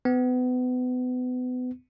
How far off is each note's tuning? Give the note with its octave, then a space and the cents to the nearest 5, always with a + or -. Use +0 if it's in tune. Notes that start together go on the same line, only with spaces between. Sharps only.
B3 +30